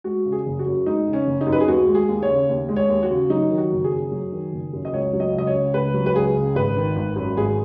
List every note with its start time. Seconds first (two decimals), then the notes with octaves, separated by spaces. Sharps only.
0.04 G#3 F#4
0.25 C#3
0.32 G#4
0.46 F#1
0.59 F#4
0.67 F#2
0.86 G#3 D#4
1.07 C#3
1.13 C#4
1.27 F#1
1.41 D#4
1.47 F#2
1.52 B4
1.60 G#4
1.68 D#2 F#4
1.87 G#3
1.95 G#4
2.09 D#2
2.22 C#5
2.29 C#3
2.49 D#2
2.69 G#3
2.76 C#5
2.89 D#2
3.03 F#4
3.11 C#3
3.30 F#3 D#4
3.50 D#3
3.58 F#4
3.72 F#1
3.84 G#4
3.92 F#2
4.12 F#3
4.32 D#3
4.52 F#1
4.73 F#2
4.85 D#5
4.93 C#2 C#5
5.13 F#3
5.20 D#5
5.34 C#2 D#5
5.47 C#5
5.54 C#3
5.74 C#2 B4
5.94 F#3
6.06 B4
6.14 C#2 G#4
6.35 C#3
6.55 G#1 B4
6.77 D#3
6.96 G#1
7.16 F#2
7.37 G#1 G#4